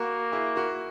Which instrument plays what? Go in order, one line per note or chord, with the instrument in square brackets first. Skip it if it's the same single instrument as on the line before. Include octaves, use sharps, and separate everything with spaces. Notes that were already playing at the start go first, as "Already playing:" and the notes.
Already playing: [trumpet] A#3 [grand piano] F#4 A#4
[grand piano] E4 G#4
F#4 A#4